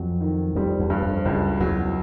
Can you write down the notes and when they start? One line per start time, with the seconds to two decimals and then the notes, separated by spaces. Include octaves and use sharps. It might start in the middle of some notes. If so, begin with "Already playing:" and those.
Already playing: F2 F#3
0.21 D#3
0.55 F2 G3
0.79 E2
0.90 G2
1.02 F2
1.25 C#2 F#2
1.60 E2 F#3